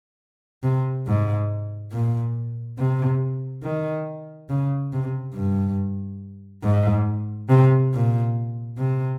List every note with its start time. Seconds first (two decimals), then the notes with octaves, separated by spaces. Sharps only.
0.63 C3
1.07 G#2
1.92 A#2
2.78 C3
3.63 D#3
4.49 C#3
4.92 C3
5.34 G2
6.63 G#2
7.49 C3
7.93 A#2
8.78 C3